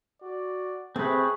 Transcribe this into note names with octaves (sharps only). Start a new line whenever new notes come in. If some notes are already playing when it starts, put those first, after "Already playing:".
F#4 D5
C3 A3 C4 G#4 B4